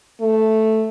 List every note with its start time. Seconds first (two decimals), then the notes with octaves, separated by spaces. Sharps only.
0.21 A3